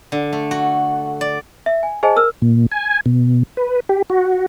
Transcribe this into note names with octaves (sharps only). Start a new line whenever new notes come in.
D3
A3
F#4
D5
E5
G#5
G#4 C5 D#5 G#5 A5
A#4 E6 F6
A#2
G#5
B2
B4
G4
F#4